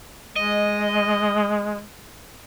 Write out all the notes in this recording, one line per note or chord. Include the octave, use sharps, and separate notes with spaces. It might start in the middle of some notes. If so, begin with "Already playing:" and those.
G#3 D#5